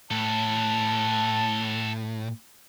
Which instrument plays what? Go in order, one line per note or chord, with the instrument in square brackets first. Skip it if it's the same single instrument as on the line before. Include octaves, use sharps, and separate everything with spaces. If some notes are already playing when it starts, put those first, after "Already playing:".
[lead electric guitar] A2 [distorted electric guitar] A4 B4 [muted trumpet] A5